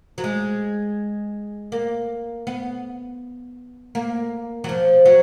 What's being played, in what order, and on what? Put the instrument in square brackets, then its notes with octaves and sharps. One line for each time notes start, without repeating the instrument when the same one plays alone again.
[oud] F#3
G#3
A#3
B3
A#3
F#3
F3
F#3